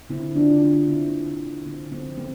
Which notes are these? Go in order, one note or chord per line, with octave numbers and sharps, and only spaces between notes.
D3 C4 E4
D3
D4 F4
D3
D4 F4
D3
D3 C4 E4
A#3
D3
D3
D3 C4
D3
C4
F3
C4